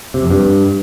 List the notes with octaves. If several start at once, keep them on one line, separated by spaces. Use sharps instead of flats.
C3
F2
G2